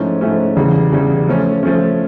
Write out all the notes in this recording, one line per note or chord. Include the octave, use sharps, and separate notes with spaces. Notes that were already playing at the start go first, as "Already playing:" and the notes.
Already playing: G#2 F3 A3 C#4 E4
G#2 F3 A3 C#4 E4
E2 C#3 E3 G3
E2 C#3 E3 G3
F3 A3 C#4
F3 A3 C#4